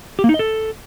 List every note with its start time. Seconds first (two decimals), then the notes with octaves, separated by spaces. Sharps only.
0.19 G4
0.24 A#3
0.29 D#4
0.34 D#5
0.39 A4